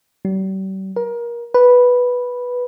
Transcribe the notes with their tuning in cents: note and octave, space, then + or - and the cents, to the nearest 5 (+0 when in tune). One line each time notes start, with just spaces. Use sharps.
G3 -40
A#4 +25
B4 -5